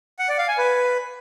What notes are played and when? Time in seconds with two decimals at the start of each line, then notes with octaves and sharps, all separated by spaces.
0.19 F#5
0.29 D5
0.38 F5
0.48 G#5
0.58 B4